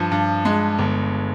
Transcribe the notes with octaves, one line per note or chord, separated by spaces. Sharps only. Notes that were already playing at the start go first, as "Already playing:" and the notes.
Already playing: G2 F3
G2
G#3
G1